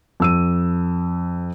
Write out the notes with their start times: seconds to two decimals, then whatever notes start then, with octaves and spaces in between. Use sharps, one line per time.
0.20 F2 E6 D#7